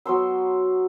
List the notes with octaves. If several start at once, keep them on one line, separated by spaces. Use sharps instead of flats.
F#3 B3 C6 E6